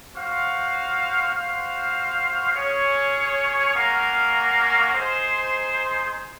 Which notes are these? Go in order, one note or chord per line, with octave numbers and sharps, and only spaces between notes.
F#4 C5 F5
F#4 C5 F5
C#4 G#4 C#5
A#3 C#4 F#4 A#4 F5
D#4 G#4 C5